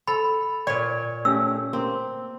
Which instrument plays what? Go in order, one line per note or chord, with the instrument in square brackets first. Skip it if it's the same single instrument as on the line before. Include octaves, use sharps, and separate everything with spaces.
[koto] A4 [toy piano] B5
[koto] A#2 C#5 [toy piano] D5
[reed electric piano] A3 C#4 G4 [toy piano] E6
[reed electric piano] A#3 [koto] C4